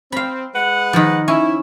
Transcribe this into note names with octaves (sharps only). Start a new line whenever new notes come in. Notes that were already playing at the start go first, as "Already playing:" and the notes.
C4 F5 B5
G#3 B4 F#5
D#3 F3
C#4 E4